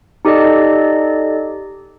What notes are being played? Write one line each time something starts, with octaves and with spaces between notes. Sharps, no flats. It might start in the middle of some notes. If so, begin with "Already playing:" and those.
D#4 G4 A4 D5 D#5